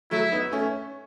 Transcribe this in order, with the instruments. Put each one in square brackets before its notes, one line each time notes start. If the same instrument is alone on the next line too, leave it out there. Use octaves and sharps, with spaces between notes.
[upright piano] F#3 A3 [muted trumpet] E4
[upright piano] B3 D#4
A3 C#4